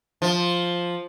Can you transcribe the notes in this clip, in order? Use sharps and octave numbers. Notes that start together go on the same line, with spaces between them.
F3